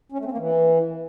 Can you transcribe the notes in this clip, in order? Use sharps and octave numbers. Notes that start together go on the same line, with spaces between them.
C#4
A3
C4
A#3
E3